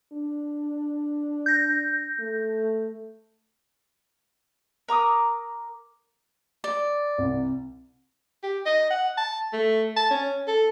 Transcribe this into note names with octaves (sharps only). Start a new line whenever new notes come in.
D4
G6 A#6
A3
A#4 A#5 D6 D#6
D5
C2
G4
D#5
F#5
A5
A3
A5
C#4
A4